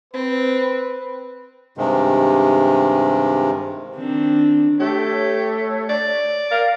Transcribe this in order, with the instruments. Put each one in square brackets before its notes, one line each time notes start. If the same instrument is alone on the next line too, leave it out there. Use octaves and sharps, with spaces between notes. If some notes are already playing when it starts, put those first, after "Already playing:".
[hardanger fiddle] C4 [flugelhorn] B4
[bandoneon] G2 C3 D#3 G#3
[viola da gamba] D#3 C4 D4
[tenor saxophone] A3 [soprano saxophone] G4 [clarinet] C#5
[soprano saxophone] D5
[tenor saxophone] A#4 [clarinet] F5